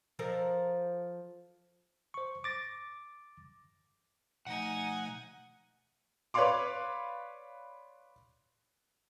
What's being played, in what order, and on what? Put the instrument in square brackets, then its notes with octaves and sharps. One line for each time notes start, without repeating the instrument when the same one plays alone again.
[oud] F3 A4 A#4
[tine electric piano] C5 C#6
D6 A6 A#6
[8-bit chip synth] B2 F3 A3 [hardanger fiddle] D#4 G#5 [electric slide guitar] F#5
[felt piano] B4 C#5 D5 F5 C6 D6